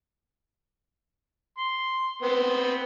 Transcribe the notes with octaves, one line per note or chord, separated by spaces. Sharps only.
C6
B3 C4